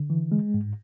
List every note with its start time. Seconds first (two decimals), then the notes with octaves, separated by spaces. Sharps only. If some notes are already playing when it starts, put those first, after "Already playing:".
Already playing: D3
0.10 E3
0.32 G#3
0.54 G#2